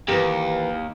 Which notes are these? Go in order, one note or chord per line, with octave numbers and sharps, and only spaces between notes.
D#2 E3 G4 A#4